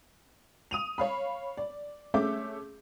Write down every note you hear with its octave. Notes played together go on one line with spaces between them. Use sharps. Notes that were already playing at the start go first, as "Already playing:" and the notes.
D#6 D#7 F7
C#5 F5 B5
D5
A3 C#4 G#4 E5 D6 G6